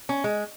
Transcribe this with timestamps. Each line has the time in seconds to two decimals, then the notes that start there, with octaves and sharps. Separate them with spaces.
0.09 C#4
0.24 G#3